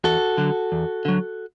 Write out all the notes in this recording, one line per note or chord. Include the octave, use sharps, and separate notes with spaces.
E2 F#4 A4
D3 F#3
E2
D3 F#3